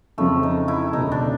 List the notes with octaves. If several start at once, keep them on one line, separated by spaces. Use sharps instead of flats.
F2 C#3 F3 A3
D#4
E4
E1 D2 C#3 D#4
D4